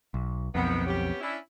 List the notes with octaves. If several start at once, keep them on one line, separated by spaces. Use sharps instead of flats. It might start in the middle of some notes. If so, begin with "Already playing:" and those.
B1
B1 F2 C3 D#3 B3
B3 C#4 G4
C#4 D4 E4